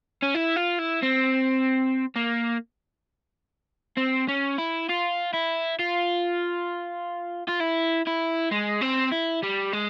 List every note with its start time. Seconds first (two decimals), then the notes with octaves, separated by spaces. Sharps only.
0.23 C#4
0.35 E4
0.57 F4
0.79 E4
1.03 C4
2.16 A#3
3.97 C4
4.28 C#4
4.58 E4
4.89 F4
5.33 E4
5.79 F4
7.49 F4
7.61 E4
8.07 E4
8.51 G#3
8.82 C4
9.12 E4
9.43 G3
9.73 G#3